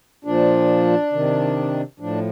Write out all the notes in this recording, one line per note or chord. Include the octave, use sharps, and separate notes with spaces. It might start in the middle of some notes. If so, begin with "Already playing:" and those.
A#2 F3 D4
C3 D#3
A2 F3 D4